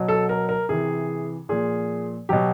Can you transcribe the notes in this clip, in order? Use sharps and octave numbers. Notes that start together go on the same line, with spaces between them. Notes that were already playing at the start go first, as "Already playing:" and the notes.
Already playing: B2 F#3
A4
A#4
A#4
C3 E3 G#4
A#2 F3 G#4
B2 F#3 G4